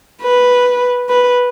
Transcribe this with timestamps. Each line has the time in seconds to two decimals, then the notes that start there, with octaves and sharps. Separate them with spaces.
0.22 B4
1.09 B4